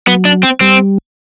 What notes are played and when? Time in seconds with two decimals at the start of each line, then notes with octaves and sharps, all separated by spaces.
0.07 F#3 B3
0.25 D4
0.43 C4
0.60 G3 C4